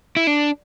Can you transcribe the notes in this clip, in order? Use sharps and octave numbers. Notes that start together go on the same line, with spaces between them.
E4
D4